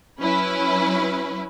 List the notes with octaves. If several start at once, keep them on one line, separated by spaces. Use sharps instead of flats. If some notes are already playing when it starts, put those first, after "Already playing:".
F#3 C#4 E4 B4